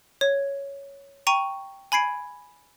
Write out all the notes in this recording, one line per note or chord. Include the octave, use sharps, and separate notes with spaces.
C#5
G5 A#5 C#6 D#7
G#5 B5 G#6 C7 D7